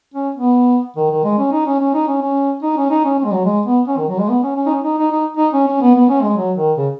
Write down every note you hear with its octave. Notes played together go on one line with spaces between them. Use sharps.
C#4
B3
D#3
D#3
G#3
C#4
D#4
C#4
C#4
D#4
C#4
C#4
D#4
C#4
D#4
C#4
C#4
G#3
F#3
G#3
B3
C#4
D#3
F#3
G#3
B3
C#4
C#4
D#4
C#4
D#4
D#4
D#4
D#4
C#4
C#4
B3
B3
C#4
G#3
F#3
D#3
C#3